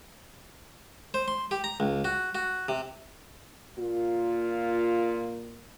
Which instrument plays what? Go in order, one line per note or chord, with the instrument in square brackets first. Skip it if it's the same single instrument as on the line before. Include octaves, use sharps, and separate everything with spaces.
[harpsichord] C5
C6
G4
A#5
C#2
F#4
F#4
C3
[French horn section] A#2 A#3 F4